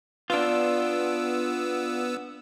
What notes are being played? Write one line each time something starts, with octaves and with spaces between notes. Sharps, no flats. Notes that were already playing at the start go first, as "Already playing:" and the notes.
B3 D4 F4 E6